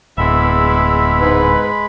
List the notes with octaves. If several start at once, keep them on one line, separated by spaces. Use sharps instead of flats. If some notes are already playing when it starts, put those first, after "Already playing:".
D1 E2 G#3 E5 B5
G#2 B4